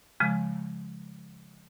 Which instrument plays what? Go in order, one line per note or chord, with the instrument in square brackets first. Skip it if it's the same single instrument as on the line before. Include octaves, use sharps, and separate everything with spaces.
[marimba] C#3 F3 G#3